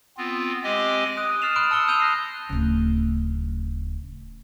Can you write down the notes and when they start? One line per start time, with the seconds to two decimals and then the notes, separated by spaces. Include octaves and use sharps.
0.17 B3 C4 F4
0.64 G#3 C4 G4 D#5 G#5
1.17 D#6 F#6 D7 D#7
1.42 D#6 F6 A6 C7 E7 F7
1.56 B5 C6 F6 F#6 D7
1.71 A5 E6 C#7 G7
1.88 D#6 E6 G6 D#7 F7 G7
2.00 F#6 A#6 C7
2.49 D1 C#3